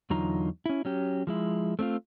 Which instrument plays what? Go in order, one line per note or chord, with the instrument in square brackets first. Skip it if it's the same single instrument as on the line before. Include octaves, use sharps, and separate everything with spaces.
[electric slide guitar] E2 D3 F#3 D#4 F4 A#5
C#4 E4
F#3 C#4 G4
F3 G#3 E4
A3 C4 E4 F4